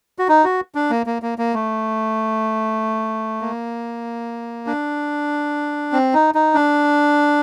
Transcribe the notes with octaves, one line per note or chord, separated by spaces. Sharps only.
F#4
D#4
F#4
D4
A#3
A#3
A#3
A#3
A3
A#3
D4
C4
D#4
D#4
D4